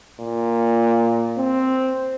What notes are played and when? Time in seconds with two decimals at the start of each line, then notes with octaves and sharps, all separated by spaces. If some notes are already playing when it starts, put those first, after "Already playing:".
0.21 A#2
1.37 C4